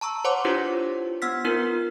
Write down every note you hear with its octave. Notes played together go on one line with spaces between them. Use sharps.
A5 A#5 C#6 E6
C5 C#5 F#5 C6 D6
D4 E4 F4 G4 B4 C5
B3 F#5 E6 F6 G#6 B6
B3 D#4 F4 A#4 B4